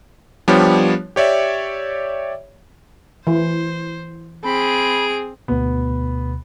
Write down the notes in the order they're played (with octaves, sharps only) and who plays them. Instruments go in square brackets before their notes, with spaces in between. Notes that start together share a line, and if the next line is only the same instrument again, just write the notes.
[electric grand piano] F3 G3 B3 D4 G4 C#5
G4 C#5 D5 E5
[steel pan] E3 [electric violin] C5
[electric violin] C4 D7 [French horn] G#4 [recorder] B5
[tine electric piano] D2 B2 [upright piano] B3